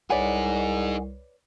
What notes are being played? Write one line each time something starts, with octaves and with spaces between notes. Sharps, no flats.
C2 D#4 G#4 B4 C#5 D5 F#5 G#5